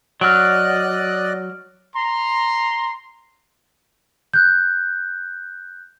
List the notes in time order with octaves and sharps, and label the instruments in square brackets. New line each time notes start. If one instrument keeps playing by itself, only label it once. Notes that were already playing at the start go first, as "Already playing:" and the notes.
[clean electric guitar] F#3 [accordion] D5 D#5 F#6 [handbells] F6 D7
[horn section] A#5 C6
[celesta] F#6 G6